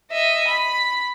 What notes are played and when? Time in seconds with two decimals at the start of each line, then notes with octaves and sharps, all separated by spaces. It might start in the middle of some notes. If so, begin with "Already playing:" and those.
0.12 D#5 E5
0.48 B5